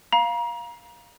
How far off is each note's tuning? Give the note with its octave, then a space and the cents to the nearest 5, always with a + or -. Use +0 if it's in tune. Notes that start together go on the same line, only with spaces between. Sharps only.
F5 +0 A#5 +35